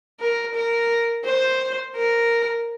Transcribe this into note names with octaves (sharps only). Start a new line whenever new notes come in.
A#4
A#4
C5
A#4